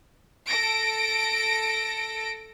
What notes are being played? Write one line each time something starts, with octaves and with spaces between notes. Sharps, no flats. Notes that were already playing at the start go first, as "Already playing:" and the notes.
A4 A#6 D7